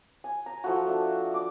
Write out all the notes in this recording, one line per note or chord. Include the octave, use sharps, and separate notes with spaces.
G#5
A#5
F3 A3 E4 F#4
A3 D4
D6